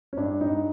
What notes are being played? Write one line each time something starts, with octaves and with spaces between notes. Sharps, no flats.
C#4
G2 D4
G2 D#4